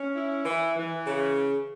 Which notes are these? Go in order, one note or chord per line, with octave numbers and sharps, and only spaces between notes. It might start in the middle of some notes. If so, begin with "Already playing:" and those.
Already playing: C#4
E4
E3
E3
C#3